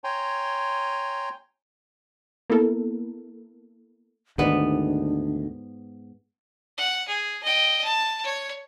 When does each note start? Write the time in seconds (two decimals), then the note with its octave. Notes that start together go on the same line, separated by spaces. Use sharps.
0.04 C#5 G5 G#5 A#5 C6
2.50 A#3 B3 E4 A4 A#4
4.38 D2 G#2 D#3 B3 D4 D5
6.77 F#5
7.08 G#4
7.43 D#5 G5
7.84 A5
8.24 C#5